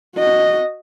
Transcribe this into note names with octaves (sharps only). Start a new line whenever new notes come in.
F#4 D#5